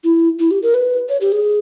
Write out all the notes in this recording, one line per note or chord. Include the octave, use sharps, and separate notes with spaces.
E4
E4
G4
A#4
B4
C#5
G4
G#4